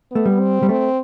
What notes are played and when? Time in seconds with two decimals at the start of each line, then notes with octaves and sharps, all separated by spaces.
0.11 A3 B3
0.26 G3
0.40 C4
0.63 G3
0.69 A3 C4